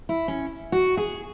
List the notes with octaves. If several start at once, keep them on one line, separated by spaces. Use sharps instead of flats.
E4
C#4
F#4
G#4